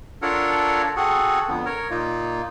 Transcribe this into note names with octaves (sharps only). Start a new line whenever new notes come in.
D4 F4 A4 A#4 C#5 F#5
C4 F#4 G#4 A4 F#5
F2 D3 B3
A#4 C#5
A#2 A#3 D#4 F4